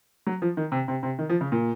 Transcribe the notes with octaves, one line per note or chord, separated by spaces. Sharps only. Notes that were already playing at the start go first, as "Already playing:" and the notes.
F#3
F3
D#3
C3
C3
C3
D#3
F3
C#3
A#2